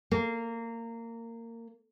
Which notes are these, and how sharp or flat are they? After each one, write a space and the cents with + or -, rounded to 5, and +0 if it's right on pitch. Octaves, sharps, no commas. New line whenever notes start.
A#3 -20